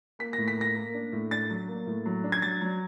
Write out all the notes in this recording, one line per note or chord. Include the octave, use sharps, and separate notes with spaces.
A#3 B6
A2 A#6
B6
A#3 A#6
A#3
D4
A2
D4 A6
F#3
A#3
A2
F#3
D4
G#6
F#3 A6
F#3